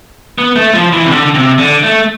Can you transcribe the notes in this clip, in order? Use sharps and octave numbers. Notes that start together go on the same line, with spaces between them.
B3
A3
F3
E3
C3
D3
C3
D3
A3